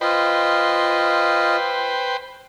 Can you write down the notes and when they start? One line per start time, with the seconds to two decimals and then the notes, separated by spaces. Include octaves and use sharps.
0.01 F4 B4 C5 D#5 G5